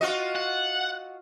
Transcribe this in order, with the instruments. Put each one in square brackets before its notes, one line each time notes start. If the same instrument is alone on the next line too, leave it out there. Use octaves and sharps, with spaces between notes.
[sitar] F4 F#4 D#5
[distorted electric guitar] F#5